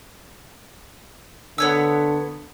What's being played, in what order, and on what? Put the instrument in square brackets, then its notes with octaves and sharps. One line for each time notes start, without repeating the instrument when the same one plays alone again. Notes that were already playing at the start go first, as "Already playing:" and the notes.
[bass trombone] D3 [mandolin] B3 C#5 E6